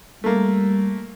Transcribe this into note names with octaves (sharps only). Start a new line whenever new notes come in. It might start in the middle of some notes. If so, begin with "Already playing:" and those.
G3 A3 A#3